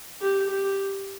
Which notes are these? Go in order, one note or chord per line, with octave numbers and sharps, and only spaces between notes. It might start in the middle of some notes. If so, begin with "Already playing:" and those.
G4
G4